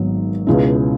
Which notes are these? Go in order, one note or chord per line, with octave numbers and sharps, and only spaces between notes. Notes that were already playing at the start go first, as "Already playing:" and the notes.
Already playing: G#1 G#2 F#3 B3
C#2 B2 G#3 C#4 E4